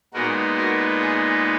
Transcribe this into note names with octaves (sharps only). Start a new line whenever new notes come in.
A#2 G#3 B3 D#4 F#4 A#4
F#4 A#4
G#4